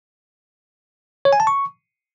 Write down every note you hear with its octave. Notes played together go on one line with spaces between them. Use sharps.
C#5
G#5
A5
C#6